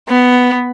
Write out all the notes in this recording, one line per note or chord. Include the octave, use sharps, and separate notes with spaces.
B3